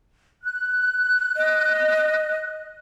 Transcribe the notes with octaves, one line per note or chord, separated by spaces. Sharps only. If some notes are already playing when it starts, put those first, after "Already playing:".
F#6
D#5